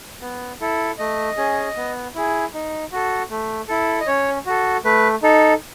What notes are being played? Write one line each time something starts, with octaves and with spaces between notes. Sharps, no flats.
B3
E4 A4
A3 D#5
C#4 G#4
B3
E4 G#4
D#4
F#4 A4
A3
E4 A4
D#5
C#4 C#5
F#4 A4
A3 B4
D#4 A4